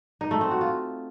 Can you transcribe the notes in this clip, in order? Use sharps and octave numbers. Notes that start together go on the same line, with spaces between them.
D#4
A3
C4
F#4
F4